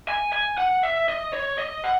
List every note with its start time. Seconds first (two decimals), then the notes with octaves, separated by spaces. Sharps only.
0.09 G#5
0.33 G#5
0.58 F#5
0.83 E5
1.08 D#5
1.33 C#5
1.58 D#5
1.84 F#5